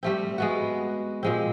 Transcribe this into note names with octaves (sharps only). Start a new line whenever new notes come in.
G3 A3 C4
G#3 B3 F#4
A#2 G#3 C4